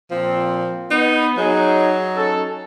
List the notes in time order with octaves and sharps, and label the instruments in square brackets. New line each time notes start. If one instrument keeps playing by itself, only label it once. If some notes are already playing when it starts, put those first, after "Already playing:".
[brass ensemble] A#2 C4 [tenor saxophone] F3
[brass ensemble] B3 [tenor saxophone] D#4
[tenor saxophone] F#3 [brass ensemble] D#4 G#4
[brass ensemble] C#4 D#4 A4